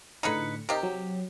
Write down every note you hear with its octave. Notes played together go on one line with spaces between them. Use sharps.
A2 D3 D#4 G#4 B4 C#7
C3 D#4 G4 A#4
F#3